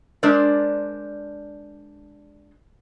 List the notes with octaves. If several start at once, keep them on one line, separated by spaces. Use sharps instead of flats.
G#3 D4 A#4 C5 D5